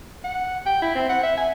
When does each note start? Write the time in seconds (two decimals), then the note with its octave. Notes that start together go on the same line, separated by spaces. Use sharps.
0.24 F#5
0.66 G5
0.82 E4
0.95 C4
1.09 F#5
1.23 E5
1.37 G#5